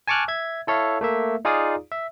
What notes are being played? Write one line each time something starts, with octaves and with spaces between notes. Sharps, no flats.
G#5 A5 C#6 D6 F6 F#6
E5 G#6
E4 A4 C#5 E5 F5
A3 A#3 E5
D#4 F4 G#4 D5 F5 D#6
E5